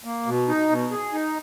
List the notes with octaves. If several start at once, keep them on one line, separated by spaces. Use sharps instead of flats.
A#3
B2
D#4
B2
G#4
D#4